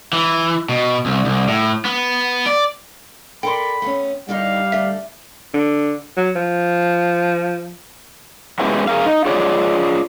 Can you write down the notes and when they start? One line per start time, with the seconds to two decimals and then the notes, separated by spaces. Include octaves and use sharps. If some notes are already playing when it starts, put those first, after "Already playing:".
0.13 E3
0.69 B2
1.06 C2
1.25 C2
1.48 A2
1.85 B3
2.46 D5
3.43 A4 A#4 D5 G5 B5 C6
3.82 A3 B3 C#4
4.29 D3 D#3 G3 D#4 F5
4.72 D3 A3 E5
5.54 D3
6.17 F#3
6.36 F3
8.59 G#3 B3 C#4 E4 F#4 G4
8.88 G#4 A#4 F5
9.06 D#4
9.25 F4 G#4 C#5 D5